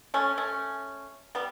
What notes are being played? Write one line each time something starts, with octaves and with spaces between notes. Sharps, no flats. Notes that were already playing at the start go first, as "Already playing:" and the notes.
A3 C#4
A3 C#4
G3 B3